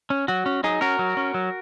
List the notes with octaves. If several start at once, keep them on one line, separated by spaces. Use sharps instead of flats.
C#4
F#3 F#4
C#4
F#3 D#4 G#4
C#4 F#4 A#4
F#3
C#4
F#3